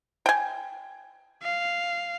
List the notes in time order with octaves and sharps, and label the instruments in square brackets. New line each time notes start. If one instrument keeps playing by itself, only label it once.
[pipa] G5 G#5
[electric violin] F5